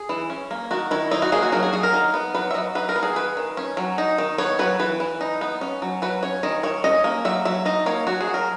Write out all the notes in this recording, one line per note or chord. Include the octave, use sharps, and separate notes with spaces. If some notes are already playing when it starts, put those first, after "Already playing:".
Already playing: G#4
E3
C#4
A#3
D#3 F#4
D#3 E4
D#4 E4
F#4
A#3 G#4
F#4
F#3 A#4
G#4
F#3 G#4
A#4
D#4
B3
F#3 B4
E5
F#3 D#5
D#4 B4
A#4
B3
G#4
D#3 B4
D#3
C#4
F#3
D#4
D#3
B3 C#5
F#3 B4
E3 B4
E3
D#4
B3
C#4
F#3
F#3 B4
C#4 C#5
D#3 D#5
D#3 C#5
C#4 D#5
A#3
F#3 E5
F#3 E5
D#4 D#5
A#3 C#5
F#3 F#4
G#4
F#3
A#4